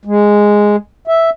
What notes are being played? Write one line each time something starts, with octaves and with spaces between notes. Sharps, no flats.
G#3
E5